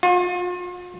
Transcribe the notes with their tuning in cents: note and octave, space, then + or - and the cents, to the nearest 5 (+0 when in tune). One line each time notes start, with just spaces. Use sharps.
F4 +40